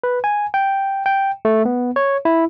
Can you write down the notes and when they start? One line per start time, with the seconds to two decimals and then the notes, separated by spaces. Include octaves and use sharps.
0.04 B4
0.24 G#5
0.54 G5
1.06 G5
1.45 A3
1.65 B3
1.96 C#5
2.25 E4